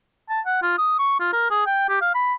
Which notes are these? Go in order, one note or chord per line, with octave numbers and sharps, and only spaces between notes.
A5
F#5
F4
D#6
C#6
F4
A#4
G#4
G5
G4
F5
B5